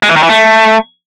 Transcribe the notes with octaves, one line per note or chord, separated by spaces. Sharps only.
G#3
E3
D#3
E3
A3